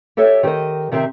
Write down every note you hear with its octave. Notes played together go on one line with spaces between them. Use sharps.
G4 A4 C#5 E5
D#3 G4 B4 C5 D#5
C3 D#3 C4 G4 E5